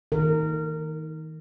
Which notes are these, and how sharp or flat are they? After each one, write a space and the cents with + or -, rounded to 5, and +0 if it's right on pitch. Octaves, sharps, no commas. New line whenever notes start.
D#3 +25 A#4 -25